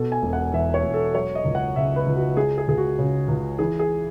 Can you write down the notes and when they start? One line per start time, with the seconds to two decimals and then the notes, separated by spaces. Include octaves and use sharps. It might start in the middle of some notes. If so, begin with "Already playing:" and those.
Already playing: B2 A4
0.12 G#5
0.22 E1
0.33 F#5
0.53 E2 E5
0.74 C#5
0.84 E1
0.94 A4
1.14 F#3 C#5
1.35 D#5
1.45 C#2
1.55 F#5
1.76 C#3 E5
1.96 B4
2.06 C#2
2.16 F#4
2.37 G#3 G#4
2.58 G#4
2.68 C#2 G#4
2.77 F#4
2.99 C#3
3.28 C#2
3.59 E3 G#4
3.79 G#4